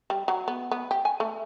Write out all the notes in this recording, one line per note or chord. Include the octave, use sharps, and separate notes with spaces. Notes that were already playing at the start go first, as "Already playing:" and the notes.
G3
F#3
B3
B3
G4
G#5
A3